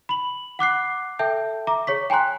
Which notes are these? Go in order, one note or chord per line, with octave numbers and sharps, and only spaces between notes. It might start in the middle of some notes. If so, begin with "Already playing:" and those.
B5 F#7
F#5 D6 F#6 C7
A4 E5 G5 A5 G6
E5 A#5 D6
G#4 C#5 C#6 B6
G5 G#5 A#5 C6 F#6